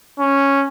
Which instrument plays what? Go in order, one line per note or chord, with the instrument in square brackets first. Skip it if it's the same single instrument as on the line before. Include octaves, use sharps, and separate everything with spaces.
[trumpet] C#4